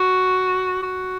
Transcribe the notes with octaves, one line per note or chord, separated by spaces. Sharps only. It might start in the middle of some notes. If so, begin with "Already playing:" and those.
Already playing: F#4
F#4